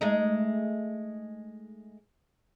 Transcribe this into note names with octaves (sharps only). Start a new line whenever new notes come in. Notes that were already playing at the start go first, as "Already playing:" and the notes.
G#3 A3 D#4